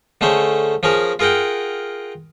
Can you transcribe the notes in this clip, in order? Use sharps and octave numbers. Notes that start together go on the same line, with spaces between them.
D3 A3 C#4 G#4 C5
F3 C#4 G#4 A#4
F4 G#4 A#4 F#5 G5